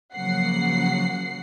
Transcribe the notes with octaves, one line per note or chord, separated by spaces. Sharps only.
C#3 F3 F#3 A#3 F#5 C7